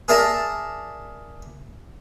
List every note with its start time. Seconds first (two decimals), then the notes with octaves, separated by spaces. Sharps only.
0.08 G#4 A#4 D5 E5 A5 A#5